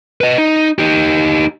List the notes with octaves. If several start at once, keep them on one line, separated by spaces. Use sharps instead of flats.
B4 D#5
D#4
D#4 G4